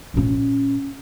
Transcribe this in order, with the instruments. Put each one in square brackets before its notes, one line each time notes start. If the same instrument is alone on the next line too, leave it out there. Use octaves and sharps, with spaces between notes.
[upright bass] A#2 C#4